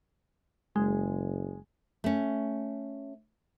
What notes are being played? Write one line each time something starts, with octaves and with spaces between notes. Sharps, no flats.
F#1 G#3
A3 C#4